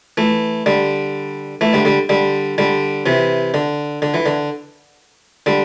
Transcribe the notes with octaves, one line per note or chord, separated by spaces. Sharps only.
E3 A3
D3 G3
E3 A3
D3 G3
D3 G3
D3 G3
D3 G3
C3 E3
D3
D3
E3
D3
D3 G3